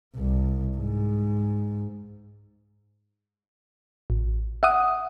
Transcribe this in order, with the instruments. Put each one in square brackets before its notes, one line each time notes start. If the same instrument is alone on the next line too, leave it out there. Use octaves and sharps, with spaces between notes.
[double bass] C2
G#2
[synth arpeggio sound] A1
E5 F#5 D#6